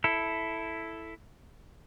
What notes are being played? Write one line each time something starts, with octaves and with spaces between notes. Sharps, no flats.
E4 A4